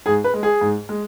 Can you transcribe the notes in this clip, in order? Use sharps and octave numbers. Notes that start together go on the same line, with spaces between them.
G#2 G#4
B4
G#3
G#4
G#2
G#3